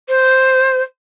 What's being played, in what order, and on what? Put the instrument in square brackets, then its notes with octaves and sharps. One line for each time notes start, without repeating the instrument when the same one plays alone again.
[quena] C5